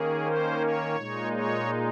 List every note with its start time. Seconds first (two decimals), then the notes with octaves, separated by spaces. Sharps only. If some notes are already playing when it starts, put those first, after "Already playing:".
Already playing: D#3 A#3 C#4 G#4
0.24 C5
0.61 C#5
0.96 A#2 G#3 D#4
1.33 C#5